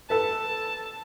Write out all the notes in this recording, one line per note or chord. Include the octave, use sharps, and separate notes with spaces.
A4 B4 A5